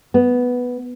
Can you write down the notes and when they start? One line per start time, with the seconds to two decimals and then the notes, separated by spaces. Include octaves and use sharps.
0.14 B3